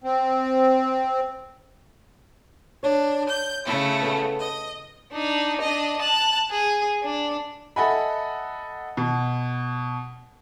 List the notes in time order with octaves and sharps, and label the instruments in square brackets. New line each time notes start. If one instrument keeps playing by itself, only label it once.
[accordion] C4
[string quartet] D4 [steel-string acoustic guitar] C#5
[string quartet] G6
C#3 A3 E4
[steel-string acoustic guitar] B3 A4
[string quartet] D#5
[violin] D4 D#4
D4 D#5
A5 F#6
G#4
D4
[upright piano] A4 D#5 E5 F#5 G#5 B5
B2